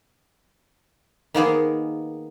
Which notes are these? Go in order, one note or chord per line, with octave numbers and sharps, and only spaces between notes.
D#3 A#3 B3 G#4